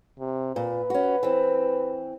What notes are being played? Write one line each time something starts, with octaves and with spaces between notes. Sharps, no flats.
C3
A#2 B4
C#4 F#4
E3 C4